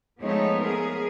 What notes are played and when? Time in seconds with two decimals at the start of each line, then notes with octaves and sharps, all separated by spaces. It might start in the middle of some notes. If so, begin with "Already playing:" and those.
0.23 F3 G#3 A3 B3 D#4 C#5
0.62 B3 G#4 A#4